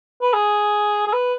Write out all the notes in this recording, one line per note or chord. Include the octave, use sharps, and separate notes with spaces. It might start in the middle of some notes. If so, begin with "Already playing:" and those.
B4
G#4
G#4
B4